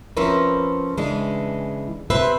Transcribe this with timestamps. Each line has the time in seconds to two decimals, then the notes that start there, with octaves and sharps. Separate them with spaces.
0.17 F3 C4 C#4 E4 A#4 B4
0.97 C#3 E3 G#3 D4
2.10 C3 C4 B4 C5 E5